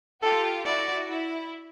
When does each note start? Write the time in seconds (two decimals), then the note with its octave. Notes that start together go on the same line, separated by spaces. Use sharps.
0.22 F4 G4 A4
0.65 E4 F#4 D5
1.09 E4